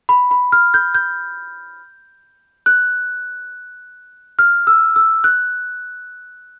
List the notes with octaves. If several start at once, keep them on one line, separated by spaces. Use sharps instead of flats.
B5
B5
F6
G6
G6
F#6
F6
E6
E6
F#6